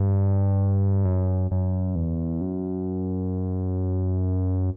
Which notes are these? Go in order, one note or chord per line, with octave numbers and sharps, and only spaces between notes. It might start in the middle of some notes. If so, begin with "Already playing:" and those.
Already playing: G2
F#2
F#2
E2
F#2